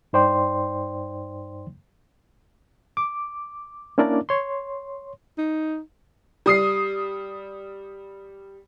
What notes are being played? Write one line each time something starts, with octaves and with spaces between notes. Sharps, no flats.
G2 D#4 C5 D5 G5 C6
D6
A#3 C#4 D4 E4 A#4 D5
C#5 C6
D#4
G3 D#6 C7